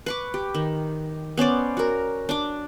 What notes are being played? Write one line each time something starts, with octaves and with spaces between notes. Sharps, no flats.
B4 C#6 D6
G4
D#3
B3 C#4 C5 D5
F#4 A#4
D4 D6